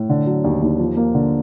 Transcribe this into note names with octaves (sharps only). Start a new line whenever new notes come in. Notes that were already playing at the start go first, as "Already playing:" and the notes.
Already playing: A2
D3
F#3
D#2
D#2
F3
A#3
D3